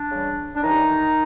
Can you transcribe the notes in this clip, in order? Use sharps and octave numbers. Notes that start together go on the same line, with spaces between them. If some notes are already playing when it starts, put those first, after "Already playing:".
Already playing: D4
C#3 E3 G3
D4
A2 D#3 E3 G3 D#4